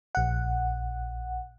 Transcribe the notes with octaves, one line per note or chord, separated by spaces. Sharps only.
A#1 F#5